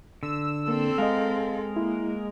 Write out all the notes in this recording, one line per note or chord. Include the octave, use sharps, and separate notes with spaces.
D3 E6
A#3 C4 A4
G#3 A#4 D#5 F5
A#3 E4